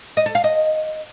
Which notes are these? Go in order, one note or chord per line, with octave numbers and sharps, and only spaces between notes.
D#5
A4
F5
D#5